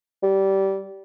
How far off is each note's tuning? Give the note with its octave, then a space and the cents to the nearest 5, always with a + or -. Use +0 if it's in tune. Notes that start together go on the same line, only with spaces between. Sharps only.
G3 -20